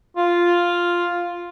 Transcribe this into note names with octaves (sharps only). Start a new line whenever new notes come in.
F4